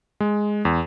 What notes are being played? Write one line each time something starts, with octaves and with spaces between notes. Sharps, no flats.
G#3
E2